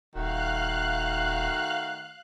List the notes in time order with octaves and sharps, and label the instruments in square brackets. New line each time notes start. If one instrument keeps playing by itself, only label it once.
[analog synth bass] D#1 [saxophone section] D#3 A3 F#4 [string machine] F5 F#6